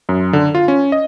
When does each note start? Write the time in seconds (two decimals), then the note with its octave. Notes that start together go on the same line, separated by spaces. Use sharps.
0.09 F#2
0.33 D3
0.55 F4
0.68 C#4
0.92 D#5